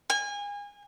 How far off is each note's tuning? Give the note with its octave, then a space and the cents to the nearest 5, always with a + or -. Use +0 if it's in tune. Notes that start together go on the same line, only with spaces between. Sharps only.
G#5 -30